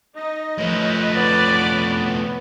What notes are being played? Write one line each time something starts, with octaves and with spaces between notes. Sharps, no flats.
D#4 D#5
A2 F3 B4 C#5
B3 D5